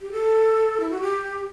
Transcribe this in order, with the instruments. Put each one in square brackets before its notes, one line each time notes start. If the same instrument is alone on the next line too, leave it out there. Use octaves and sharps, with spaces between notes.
[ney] G4
A4
E4
F#4
G4